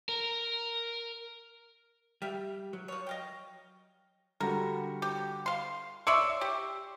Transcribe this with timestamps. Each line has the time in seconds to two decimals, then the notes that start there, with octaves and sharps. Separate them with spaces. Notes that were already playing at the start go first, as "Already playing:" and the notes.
0.09 A#4
2.22 G3 E5 F5 G5
2.73 F#3
2.88 F3 C#5
3.07 D#5 F5 G5
4.40 D3 G3 F#4 A#4
5.02 G4
5.46 F5 C6
6.07 C#5 D5 E5 C6 E6
6.41 G4